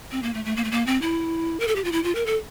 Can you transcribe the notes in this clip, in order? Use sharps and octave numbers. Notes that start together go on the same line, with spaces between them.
C4
A#3
A3
A3
A#3
A3
A#3
C4
E4
A#4
A4
G4
F4
E4
F4
A#4
A4